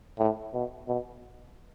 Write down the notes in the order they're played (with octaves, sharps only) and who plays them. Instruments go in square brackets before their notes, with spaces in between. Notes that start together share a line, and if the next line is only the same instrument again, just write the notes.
[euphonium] A2
B2
B2